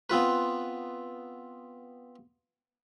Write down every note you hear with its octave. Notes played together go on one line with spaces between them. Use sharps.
B3 C4 F4 B4